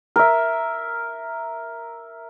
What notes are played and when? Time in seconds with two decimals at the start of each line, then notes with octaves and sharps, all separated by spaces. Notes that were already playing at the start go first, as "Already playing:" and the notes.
0.16 A#4 E5